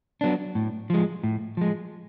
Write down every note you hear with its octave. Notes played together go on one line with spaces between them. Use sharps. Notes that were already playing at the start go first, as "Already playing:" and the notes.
F#3 B3 D4
A2
F3 G#3
A2
F3 G#3